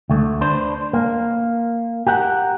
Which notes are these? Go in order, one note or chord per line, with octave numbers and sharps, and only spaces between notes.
D2 A3
D4 B4 C5
A#3
G4 A#4 F#5